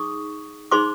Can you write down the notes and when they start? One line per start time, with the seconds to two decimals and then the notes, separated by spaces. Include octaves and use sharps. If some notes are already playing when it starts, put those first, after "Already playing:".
Already playing: D#4 G#4 C#6 D#6
0.71 D#4 G#4 C5 C6 D6